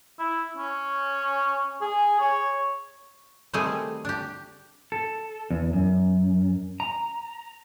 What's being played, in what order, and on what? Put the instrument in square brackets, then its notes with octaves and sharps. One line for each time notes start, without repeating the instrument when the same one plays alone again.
[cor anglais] E4
C#4
G#4
C#5
[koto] D#3 G3 A3 C4 G#4 G#5
D4 G4
[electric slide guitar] A4
E2
F#2
A#5